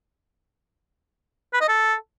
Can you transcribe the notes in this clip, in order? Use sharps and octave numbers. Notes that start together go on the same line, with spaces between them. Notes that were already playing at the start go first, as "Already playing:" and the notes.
B4
D#5
A4